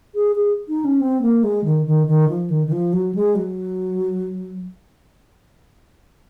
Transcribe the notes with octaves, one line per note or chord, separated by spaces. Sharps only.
G#4
G#4
D#4
C#4
C4
A#3
G#3
D#3
D#3
D#3
F3
D#3
D#3
F3
F#3
G#3
F#3